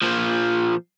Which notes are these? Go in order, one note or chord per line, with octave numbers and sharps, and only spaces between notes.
A#2 F3